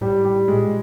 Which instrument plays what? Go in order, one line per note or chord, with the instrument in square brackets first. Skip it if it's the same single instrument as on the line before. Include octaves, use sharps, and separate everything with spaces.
[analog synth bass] A2 [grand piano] G3
[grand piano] G3
[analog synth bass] A#2 [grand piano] G#3